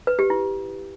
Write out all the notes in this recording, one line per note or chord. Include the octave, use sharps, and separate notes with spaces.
B4
G4
E4